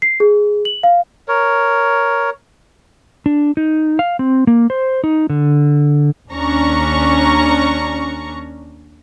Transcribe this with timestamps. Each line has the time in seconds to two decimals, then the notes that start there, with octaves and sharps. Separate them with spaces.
0.02 C7
0.20 G#4
0.65 F#7
0.83 F5
1.28 A#4 C#5
3.26 D4
3.57 D#4
3.99 F5
4.19 C4
4.47 A#3
4.70 C5
5.04 D#4
5.30 D3
6.30 D#2 C#4 D4 A#5 C#6